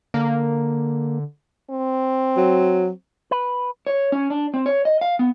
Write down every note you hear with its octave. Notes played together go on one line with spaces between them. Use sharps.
D3 A#3
C4
F#3
B4
C#5
C#4
D4
C4
C#5
D#5
F5
B3